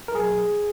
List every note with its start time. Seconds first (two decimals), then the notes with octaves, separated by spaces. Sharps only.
0.08 A#4
0.14 B1 G#4